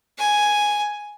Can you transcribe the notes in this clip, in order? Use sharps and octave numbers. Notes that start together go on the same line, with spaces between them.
G#5